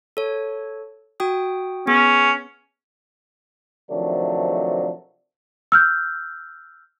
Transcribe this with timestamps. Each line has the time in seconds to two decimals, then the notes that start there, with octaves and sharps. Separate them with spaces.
0.17 A4 C#5
1.20 F#4 G5 D#6
1.87 B3 C#4 G#4
3.90 C3 D#3 F3 F#3 A3 D4
5.72 E6 F6 G6